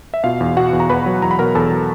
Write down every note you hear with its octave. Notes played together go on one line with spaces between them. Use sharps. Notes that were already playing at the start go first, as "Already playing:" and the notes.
E5
B2 F4 F5
E2
B2 F#4 F#5
E2
A#5
E2 B4 B5
F#3
E2 A#5
B5
B2 A#4 A#5
E2 A4 A5
F#3